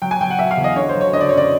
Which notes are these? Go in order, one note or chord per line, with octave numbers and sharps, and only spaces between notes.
F#3 G5
G#5
F#3 G5
F#5
F#3 E5
F5
E2
D#5
D3 C#5
C5
F#3
C#5
D3 D#5
D5
F#2 C#5
D5